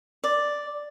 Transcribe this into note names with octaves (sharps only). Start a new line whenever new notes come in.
D5